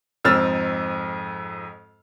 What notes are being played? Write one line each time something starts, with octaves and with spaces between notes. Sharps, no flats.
F2 G#2 C4 E6 F6 A6